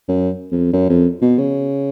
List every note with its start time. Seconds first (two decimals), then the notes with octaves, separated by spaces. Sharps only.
0.08 F#2
0.52 F2
0.73 F#2
0.89 F2
1.22 B2
1.38 C#3